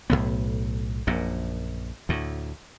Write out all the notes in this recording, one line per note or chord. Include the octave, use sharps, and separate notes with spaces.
B1 F#2 A2 B3
A#1 F#2 A#2
D2 A2